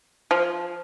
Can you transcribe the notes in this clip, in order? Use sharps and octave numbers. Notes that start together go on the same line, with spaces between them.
F3